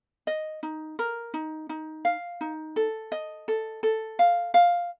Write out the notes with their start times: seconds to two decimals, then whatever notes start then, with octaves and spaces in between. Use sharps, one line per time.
0.27 D#5
0.63 D#4
0.99 A#4
1.34 D#4
1.69 D#4
2.05 F5
2.41 D#4
2.76 A4
3.12 D#5
3.48 A4
3.83 A4
4.19 F5
4.54 F5